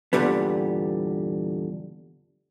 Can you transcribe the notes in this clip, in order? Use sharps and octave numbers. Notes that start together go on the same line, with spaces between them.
E2 G2 A#2 D3 G3 B3